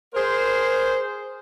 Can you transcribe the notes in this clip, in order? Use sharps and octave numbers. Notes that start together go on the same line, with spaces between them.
G#4 A#4 C5